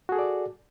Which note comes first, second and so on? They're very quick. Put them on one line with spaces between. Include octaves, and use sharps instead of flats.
F#4 G#4 A4 D5